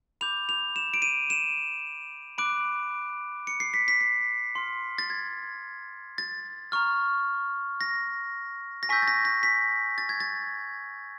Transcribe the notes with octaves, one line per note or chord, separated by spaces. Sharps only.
B5 D6 G6 F7
F7
E7
D7
D#7
E7
B5 D6 F#6 D7
C#7
C7
B6
B6
C7
C6 F6
A6
G#6
A6
A#5 C#6 F6
A#6
A#6
G#5 C#6 E6 G6 B6
A6
A#6
A#6
B6
A6
G#6
A6